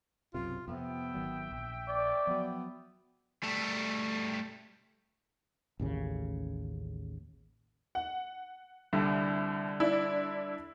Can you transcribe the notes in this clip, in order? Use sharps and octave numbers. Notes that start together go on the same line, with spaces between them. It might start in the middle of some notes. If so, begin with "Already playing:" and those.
B1 F#2 C3 F4
F2 C3 B3 E5 G5
G#1 D#3 F#3
A#1
D5
F3 F#3 B3
G3 A3
A1 D#2 C#3
F#5
C2 D3 G3
D4 E4